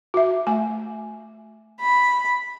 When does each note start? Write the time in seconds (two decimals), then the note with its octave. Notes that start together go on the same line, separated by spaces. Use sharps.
0.14 F#4 E5
0.47 A3 G#5
1.81 B5